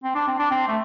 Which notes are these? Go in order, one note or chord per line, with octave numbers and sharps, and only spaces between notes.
C4
D4
C4
D4
C4
A3